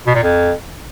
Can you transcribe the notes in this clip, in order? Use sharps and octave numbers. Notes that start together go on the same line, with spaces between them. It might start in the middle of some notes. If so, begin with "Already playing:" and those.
B2
A#2
F2